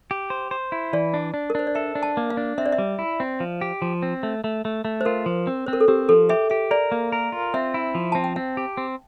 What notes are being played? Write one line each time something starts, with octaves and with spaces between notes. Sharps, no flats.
G4
C5
C5
E4
E3 D5
D4
D4
A#4
D4 C5
D5
A4 E5
D4
A5
A#3
F5
D4
C4 E5
D5
E5
G3
E4
C4
F3
G4
F3
C4
A3
A3
A3
A3
C5
F4 A#4
F3
C4
C4 C5
A#4
A4
C4 G4
F3 A4
G4 E5
G4 E5
A#4 D5
A#3
A#4
F4
C4 E5
E4
F3
C4 A5
G5
C4 F5
G4
C4